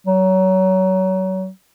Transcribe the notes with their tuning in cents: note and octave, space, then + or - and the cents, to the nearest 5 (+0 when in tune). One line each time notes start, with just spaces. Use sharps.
F#3 +25